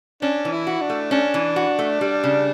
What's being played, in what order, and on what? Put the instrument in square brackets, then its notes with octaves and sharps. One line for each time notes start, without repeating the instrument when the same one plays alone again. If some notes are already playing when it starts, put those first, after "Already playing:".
[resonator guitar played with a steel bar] C#4 [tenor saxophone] D4
[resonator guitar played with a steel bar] E3
[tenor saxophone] E4
[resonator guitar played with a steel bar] F#4
[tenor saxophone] D4
[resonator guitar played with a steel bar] A3
[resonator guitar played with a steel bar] C#4 [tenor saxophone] D4
[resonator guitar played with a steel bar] E3
F#4
A3
G3
C#3